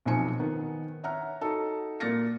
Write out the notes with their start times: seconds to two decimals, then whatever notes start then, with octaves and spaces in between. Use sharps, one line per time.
0.06 B1 B2 F3 C4 G#5 C#7
0.40 D#3 B3
1.03 C#5 E5 F#5 A#5 F6
1.41 D#4 F#4 A4
2.00 A#2 F6 A6 A#6 C#7